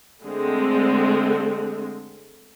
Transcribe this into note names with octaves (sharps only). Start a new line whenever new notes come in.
D3 G#3 A3 C4